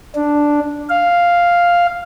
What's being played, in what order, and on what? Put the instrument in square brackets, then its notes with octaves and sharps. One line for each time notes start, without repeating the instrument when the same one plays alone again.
[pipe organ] D4
F5